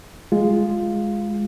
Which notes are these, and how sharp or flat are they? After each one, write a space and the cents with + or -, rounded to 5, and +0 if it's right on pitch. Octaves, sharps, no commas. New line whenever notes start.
G#3 +0 F4 +0